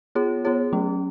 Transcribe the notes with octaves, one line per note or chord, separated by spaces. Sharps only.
B3 F4 G#4 C#5
B3 F4 G#4 C#5
F#3 A3 C#4